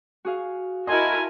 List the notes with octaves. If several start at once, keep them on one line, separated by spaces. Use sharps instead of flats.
F#4 G#4 F5
E4 F#4 A4 A#4 D#5 G#5 A5 C6